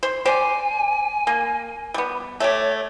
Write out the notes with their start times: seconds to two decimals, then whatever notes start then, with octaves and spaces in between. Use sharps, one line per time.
0.03 C5
0.25 G4 C5 D5 G#5
1.27 A#3
1.94 G3 B3
2.40 A3 G4 C#5